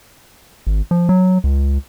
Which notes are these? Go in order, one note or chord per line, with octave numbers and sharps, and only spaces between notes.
G#1
F3
F#3
C#2